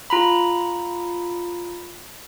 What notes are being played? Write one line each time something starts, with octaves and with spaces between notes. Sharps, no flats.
F4 A#5 B5